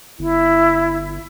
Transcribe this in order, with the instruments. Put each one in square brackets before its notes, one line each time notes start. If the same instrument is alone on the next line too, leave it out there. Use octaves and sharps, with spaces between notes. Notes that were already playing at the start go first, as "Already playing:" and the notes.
[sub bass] G1 [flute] E4